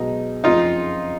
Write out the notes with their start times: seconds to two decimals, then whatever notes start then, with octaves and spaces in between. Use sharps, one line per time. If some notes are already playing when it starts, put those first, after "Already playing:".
Already playing: B1 B2 G#3 B3 D#4
0.44 F#1 F2 C#3 F3 D#4 F4